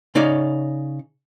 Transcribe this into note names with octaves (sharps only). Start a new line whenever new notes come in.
C#3 D#4 C#5 D5